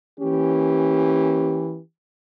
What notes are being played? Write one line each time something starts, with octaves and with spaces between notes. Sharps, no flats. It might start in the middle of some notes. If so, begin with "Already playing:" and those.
E3 A#3 C#4 G4